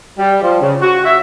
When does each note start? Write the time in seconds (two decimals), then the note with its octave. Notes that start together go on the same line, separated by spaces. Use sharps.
0.18 G3
0.42 F3
0.60 C#3
0.81 F#4
1.05 E5